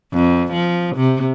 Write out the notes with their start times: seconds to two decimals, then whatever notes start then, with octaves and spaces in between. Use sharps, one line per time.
0.13 F2
0.52 F3
0.96 C3